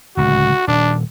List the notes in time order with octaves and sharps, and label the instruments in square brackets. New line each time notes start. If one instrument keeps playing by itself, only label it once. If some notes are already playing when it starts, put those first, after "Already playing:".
[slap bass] D1 C#2 [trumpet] F#4
[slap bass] D#1 [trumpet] D4